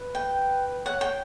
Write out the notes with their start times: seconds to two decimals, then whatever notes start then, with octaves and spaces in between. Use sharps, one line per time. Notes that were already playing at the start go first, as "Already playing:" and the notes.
Already playing: B4
0.15 G5
0.86 C#5 F#5
1.01 G5